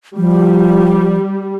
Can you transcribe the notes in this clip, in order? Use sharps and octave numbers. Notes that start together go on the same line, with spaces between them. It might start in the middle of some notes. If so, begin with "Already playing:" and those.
F3 G3